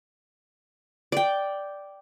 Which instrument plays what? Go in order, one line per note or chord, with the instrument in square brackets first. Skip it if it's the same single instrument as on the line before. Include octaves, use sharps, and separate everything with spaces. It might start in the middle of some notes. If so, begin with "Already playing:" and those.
[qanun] D5 G5